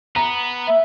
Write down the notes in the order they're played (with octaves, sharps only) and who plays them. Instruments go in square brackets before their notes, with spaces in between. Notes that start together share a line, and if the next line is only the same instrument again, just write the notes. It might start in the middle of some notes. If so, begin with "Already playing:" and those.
[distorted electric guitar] B3 [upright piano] A#5
[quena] E5